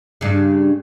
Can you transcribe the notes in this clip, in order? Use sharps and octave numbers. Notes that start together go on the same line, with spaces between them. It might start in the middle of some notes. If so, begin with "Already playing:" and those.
G2 C#3